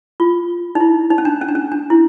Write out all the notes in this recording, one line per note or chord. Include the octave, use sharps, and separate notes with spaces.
F4
D#4
E4
D#4
C#4
D4
C#4
D4
C#4
D4
E4